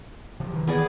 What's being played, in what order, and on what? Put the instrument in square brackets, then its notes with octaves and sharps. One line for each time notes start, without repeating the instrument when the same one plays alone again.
[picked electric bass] D1 C3 F3
D#3 E3
[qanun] B3 G#4 D5